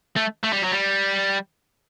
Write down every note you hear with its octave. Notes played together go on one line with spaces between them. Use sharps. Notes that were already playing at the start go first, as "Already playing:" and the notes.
A3
A3
G3
F#3
G3